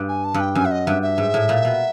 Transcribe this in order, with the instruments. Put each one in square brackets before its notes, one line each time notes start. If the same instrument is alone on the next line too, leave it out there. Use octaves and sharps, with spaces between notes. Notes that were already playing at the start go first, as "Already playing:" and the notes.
Already playing: [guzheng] G2
[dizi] G#5
A5
[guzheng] G2
[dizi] G5
[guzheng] F#2 [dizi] G#5
[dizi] E5
D#5
[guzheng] G2 [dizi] E5
[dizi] E5
[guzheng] G#2
A2
A#2
B2